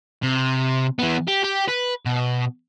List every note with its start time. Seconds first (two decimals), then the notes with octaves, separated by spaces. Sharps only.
0.23 C3
0.99 E3 B3
1.28 G4
1.43 G4
1.68 B4
2.06 B2